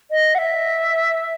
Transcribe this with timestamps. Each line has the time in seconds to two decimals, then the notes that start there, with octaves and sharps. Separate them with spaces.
0.11 D#5
0.34 F#5
0.38 E5